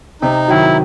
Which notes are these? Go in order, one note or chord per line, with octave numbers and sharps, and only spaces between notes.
C3 D#4
D#3 F#3 E4